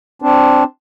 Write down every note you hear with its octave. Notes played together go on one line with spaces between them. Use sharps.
C4 D4